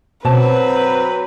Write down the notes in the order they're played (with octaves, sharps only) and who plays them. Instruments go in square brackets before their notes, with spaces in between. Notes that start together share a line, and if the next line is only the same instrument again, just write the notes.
[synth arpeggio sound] B2 A5 [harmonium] F#3 [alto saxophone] C4 [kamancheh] B4